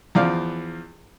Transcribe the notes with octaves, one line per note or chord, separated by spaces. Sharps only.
E2 F3 D5 F5